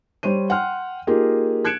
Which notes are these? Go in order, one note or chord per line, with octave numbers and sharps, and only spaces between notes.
G3 C5 C#5 D#7
F#5 G5 C6 F6
A#3 D#4 F4 G4 G#4 A#4
F#6 G#6 C#7 D7 E7